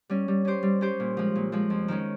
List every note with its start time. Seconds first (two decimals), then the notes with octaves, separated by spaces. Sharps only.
0.10 G3 C#4
0.28 G3
0.45 C#4 G4 C5
0.63 G3
0.81 C#4 G4 C5
1.00 A#2
1.17 F3 G#3
1.35 A#2
1.52 F3 G#3
1.70 F2
1.88 D#3 G#3 C#4